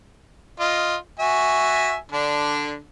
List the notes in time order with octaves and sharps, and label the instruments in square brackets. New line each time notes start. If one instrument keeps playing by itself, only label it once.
[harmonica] F4 D#5
F#4 E5 G#5
D3 D4